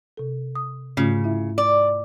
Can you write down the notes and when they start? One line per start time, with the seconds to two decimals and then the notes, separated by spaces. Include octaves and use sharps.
0.17 C3 A4
0.55 D#6
0.97 G#2 C#3 A3 F4
1.24 E4 E5
1.58 D5